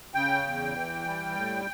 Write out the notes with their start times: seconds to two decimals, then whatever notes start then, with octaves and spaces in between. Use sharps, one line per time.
0.14 C#3 G5
0.45 E2
0.76 E3
1.05 G3
1.35 A2